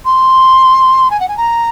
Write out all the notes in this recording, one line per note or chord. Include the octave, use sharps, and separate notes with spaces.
C6
G#5
F#5
G#5
A#5